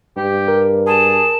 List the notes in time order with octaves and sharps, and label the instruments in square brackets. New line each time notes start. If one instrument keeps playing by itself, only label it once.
[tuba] G2 [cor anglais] G4
[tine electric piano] A#4
[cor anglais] G#4 [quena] A5